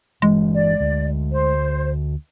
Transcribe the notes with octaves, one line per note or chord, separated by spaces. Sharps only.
G1 E3 G#3
D5
D2
C5